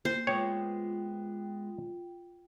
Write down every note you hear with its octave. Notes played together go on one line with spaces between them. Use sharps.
A#3 C5
G#3 B3 F4 C#5 G5